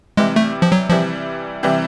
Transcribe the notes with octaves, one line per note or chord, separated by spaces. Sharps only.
C3 E3 G3 G#3
A3
F3
F#3
C3 E3 F3 G3
C3 E3 G3